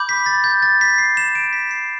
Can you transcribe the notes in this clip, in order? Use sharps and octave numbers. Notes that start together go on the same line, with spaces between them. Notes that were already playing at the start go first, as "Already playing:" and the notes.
Already playing: B5 D6 G6
B6
A6
G6
A6
B6
C7
E7
D7
B6
C7